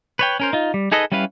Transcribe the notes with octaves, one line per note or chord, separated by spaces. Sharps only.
B4 C#5 G5
C#4 A#4 C5
D#4 F4
G3
D#4 G#4 A4 B4 D#5
G3 C#4 E4 B4 F5